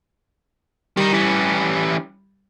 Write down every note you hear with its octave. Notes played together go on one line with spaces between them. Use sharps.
D#3 G3 D#4
E3 C#4